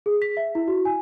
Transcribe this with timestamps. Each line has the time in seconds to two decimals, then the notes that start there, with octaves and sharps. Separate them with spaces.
0.06 G#4
0.22 B6
0.37 E5
0.55 E4
0.68 F#4
0.85 G#5